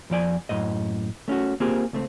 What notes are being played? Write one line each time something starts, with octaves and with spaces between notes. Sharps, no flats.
F2 F3 D5 G#5
F#2 A2 D#5
A3 C#4 F4 F#4
A#3 C4 F4 G4 G#4
C#2 A3 C4